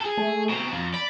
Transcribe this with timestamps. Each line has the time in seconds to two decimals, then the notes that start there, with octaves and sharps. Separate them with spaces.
0.01 G#4 A4
0.17 A3
0.49 B2 C4 A#5
0.72 F2
0.94 D5 B5